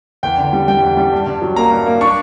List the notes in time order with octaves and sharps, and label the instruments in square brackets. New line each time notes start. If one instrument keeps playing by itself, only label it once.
[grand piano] E2 G5
D3
G3
G3 G5
E2
G3
G2
G2
F#3
A#3 A#5
G2
A#3
D4 C#6